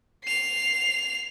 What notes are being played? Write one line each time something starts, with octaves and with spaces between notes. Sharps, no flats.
C7 F7